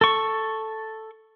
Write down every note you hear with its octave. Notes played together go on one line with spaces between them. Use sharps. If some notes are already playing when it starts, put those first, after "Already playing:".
A4 C#6